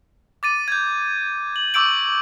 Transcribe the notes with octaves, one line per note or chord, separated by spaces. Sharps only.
D6 A6 D#7
G6 G#6
F#7
C#6 D6 E6 G6 D7 F#7